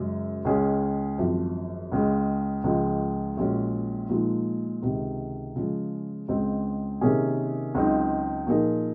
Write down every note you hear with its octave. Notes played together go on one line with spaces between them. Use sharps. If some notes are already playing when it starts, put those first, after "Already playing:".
Already playing: F#2 C#3 G#3
C#2 C#3 G#3 C#4 G#4
G#1 F#2 F3
C#2 C#3 G#3
C#2 C#3 F3 G#3
A#1 A#2 G#3 C#4 F#4
A#2 F3 G#3 D#4
C#2 C3 D#3
C#3 F3 G#3
C#2 C#3 G#3 C4
C3 D#3 A#3 C#4 G#4
C#2 C#3 F#3 C4 D#4
A#2 F3 A#3 D#4 G#4